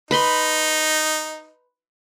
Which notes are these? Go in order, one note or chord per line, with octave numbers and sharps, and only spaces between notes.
D#4 B4 B5 C6